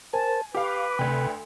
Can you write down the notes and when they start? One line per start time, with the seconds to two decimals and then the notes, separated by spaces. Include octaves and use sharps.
0.13 A#4 C5 G#5 A5
0.55 G4 B4 F5 D6
0.99 D2 C3 A3 G5